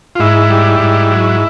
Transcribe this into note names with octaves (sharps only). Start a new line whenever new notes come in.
F4
G#2 E4
G3
G#2
F#3